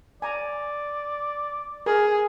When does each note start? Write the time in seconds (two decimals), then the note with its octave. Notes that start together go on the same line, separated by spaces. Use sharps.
0.22 D5 G#5 A#5
1.86 G#4 A#4